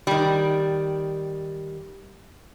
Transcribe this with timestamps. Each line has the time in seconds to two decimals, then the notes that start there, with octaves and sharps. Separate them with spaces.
0.07 D#3 G3